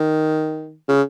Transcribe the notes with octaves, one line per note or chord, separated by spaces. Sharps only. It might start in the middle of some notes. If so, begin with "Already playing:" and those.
Already playing: D#3
C#3